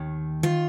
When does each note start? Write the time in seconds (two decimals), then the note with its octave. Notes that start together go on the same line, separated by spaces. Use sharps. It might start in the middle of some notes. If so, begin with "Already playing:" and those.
Already playing: D#2 D#3
0.43 D#3 F4